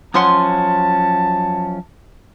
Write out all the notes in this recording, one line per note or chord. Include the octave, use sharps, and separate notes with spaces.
F#2 F3 C#4 F#5 A5 C6 D#6